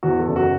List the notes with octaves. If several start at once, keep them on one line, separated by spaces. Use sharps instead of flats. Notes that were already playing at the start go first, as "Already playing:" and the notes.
E2 F#4
A4
F#1
F#4